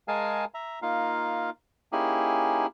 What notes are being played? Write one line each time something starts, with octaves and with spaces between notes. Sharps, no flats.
G#3 G#4 A#4 F5 G#5 A5
E5 A#5
A#3 D#4 F4 F5
A#3 C#4 D#4 E4 G4 G#4